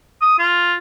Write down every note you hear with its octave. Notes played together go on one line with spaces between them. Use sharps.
D#6
F4